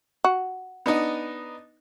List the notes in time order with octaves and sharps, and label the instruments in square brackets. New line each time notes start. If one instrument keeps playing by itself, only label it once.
[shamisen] F#4
[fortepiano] B3 D4 D#4